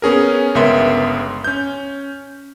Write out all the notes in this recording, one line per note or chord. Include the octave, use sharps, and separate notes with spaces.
B3 C#4 G#4 A#4
G1 C#2 B3 A#4 E5 C6
C#4 G6